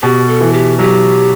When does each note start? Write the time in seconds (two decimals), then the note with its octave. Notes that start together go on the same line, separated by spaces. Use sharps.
0.02 B2 G4
0.28 A4
0.41 E3
0.53 G4
0.79 F#3 G4